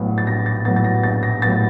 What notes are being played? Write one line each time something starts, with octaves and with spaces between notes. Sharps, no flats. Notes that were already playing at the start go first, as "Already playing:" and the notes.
Already playing: A#1 A2 F#3 B3
A6
A#1 A#6
A6
A2 F#3 B3 A6
A6
A#6
A#1 A6
A#6
A2 F#3 B3 A6